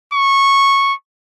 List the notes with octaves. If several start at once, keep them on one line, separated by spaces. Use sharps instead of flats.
C#6